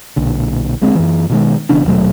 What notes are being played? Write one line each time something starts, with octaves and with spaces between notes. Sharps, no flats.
B1 A#2 D3
D2 G#3 C4
F#2 E3
B2 D#3 G#3
E1 E2 C#3 D4
D#1 B2 F#3 A3